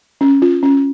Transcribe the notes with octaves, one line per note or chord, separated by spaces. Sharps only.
C#4
F4
C#4